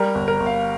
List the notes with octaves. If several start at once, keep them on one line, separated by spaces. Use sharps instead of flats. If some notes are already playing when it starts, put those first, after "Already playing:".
Already playing: G3 A#4
G1
A#4
G1
F5